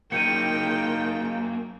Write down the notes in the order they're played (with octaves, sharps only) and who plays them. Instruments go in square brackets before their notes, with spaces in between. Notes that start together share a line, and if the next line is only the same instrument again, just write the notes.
[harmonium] C#3 D#4 A#4 [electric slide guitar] F#3 A#3 [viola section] G5 [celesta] C#7 D#7